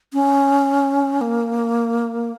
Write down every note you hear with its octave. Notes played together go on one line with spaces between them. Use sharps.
C#4
A#3